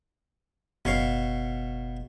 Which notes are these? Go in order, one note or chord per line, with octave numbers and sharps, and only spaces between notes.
F#1 B2 C#5 F5